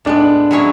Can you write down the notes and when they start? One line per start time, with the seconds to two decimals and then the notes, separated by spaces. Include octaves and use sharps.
0.05 A2 G#3 B3 D4
0.51 F#3 C#4 E4 G#4 C#5